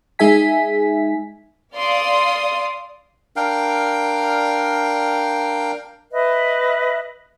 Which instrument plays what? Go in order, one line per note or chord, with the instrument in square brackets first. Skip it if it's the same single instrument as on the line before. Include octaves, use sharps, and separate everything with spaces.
[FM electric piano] G#3 D#4 G#4 E5 G#5 B6
[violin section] D5 F5 C6 D#6
[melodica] D4 A#4 F5 G5
[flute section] B4 D#5 E5